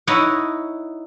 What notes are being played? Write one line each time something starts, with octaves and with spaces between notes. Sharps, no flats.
D#4 E4 C#5 D#5 F#5